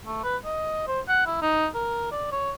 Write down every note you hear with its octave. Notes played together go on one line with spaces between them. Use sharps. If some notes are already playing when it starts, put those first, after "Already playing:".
A3
B4
D#5
C5
F#5
E4
D#4
A#4
D5
C#5